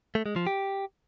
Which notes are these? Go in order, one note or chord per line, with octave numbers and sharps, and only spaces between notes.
A3
G#3
F3
G4